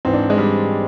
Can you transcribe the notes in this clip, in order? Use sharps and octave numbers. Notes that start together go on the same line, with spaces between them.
G#2 E3 C4
D4
G#3
G3